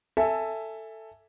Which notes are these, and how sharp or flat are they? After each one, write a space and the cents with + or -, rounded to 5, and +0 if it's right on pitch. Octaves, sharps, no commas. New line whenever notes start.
A4 +10 E5 +0 G#5 +0